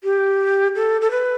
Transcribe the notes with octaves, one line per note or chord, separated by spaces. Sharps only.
G4
A4
A4
B4